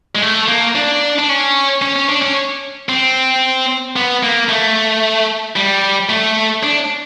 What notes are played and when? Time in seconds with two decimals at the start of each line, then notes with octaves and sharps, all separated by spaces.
0.15 G#3
0.22 A3
0.49 A#3
0.75 D4
1.19 D4
1.29 C#4
1.82 C#4
1.96 C#4
2.09 D4
2.22 C#4
2.89 C4
3.96 B3
4.23 A#3
4.49 A3
5.56 G3
6.09 A3
6.63 D4